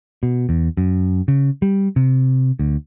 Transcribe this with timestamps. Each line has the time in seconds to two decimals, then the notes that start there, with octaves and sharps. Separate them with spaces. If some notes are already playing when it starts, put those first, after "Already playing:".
0.23 B2
0.49 E2
0.77 F#2
1.28 C#3
1.62 G3
1.96 C3
2.59 D2